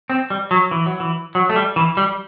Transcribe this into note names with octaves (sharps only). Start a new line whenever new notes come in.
C4
G3
F#3
E3
F#3
E3
F#3
A3
G3
E3
G3